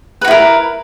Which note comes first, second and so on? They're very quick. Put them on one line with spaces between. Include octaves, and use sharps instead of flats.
B4 F#4 E4 A#4